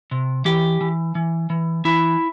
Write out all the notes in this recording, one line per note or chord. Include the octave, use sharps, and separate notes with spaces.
C3
E3 G4
E3
E3
E3
E3 E4